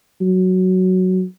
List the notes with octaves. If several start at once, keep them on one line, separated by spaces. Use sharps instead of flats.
F#3